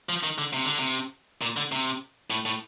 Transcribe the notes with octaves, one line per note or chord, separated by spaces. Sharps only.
F3
D#3
D3
C3
D3
C3
A#2
D3
C3
A2
A2